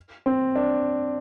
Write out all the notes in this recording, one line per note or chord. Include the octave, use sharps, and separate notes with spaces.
C4
D4